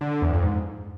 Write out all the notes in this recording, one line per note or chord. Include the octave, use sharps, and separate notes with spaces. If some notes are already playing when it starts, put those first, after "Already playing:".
D3
D3
E2
F2
G#2